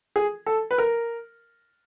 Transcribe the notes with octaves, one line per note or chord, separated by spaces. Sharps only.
G#4
A4
B4
A#4